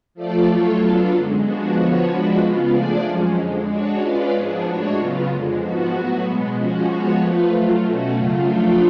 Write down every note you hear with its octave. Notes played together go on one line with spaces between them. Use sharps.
F3 A3 F4 A4 D5
F#3 A3 F4 A4 C#5
F#3 B3 D4 F4 A4
F#2 D3 G#3
F3 G#3 B3 D4 F#4
D3 F3 B3 F#4 C#5
F3 G#3 D4 F#4 B4
C#3 G#3 B3 F4
F3 A3 D4 G#4 D5
F#2 F3 G#3 C#4
F2 D3 G#3
G#3 D4 F#4 C#5
G#3 C#4 F4 B4 D5
G#2 F3 B3 D4 G#4
A2 G#3 D4 F#4 C#5
C#3 F#3 B3 F4
F2 D3 G#3
G#2 F3 B3 F#4
A2 F#3 B3 F#4
B2 G#3 B3
F3 G#3 C#4 F#4
F3 G#3 B3 F#4 C#5
F3 A3 F4 B4
F#3 A3 F4
B2 A3 C#4 F#4
F#2 C#3 F#3 A3 F4
F3 A3 D4 F4 A4